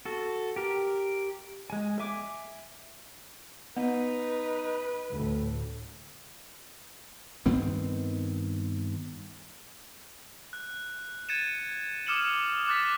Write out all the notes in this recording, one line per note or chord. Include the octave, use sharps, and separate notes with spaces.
F#4 A4
G4 A#4
G#3 G#5
E5 G#5 D6
B3 D#4 B4
D2 A2
G2 D#3 B3 C4
F#6
G#6 A6 C#7 D#7 E7
D6 D#6 F6 C#7 E7 F#7
D6 F#6 A6 B6